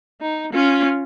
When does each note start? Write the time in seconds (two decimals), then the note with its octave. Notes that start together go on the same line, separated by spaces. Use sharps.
0.21 D#4
0.53 C#4 F4